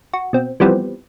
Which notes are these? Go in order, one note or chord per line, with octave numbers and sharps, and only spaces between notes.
F#4
B2 C4
E3 F3 G3 B3 C4